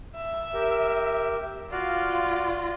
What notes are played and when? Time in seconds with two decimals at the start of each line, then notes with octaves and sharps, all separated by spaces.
0.16 E5
0.53 G4 A#4
1.71 F4 F#4 D5 F5